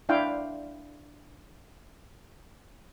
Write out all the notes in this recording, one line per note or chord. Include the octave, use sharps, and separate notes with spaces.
D4 E4 F5 G5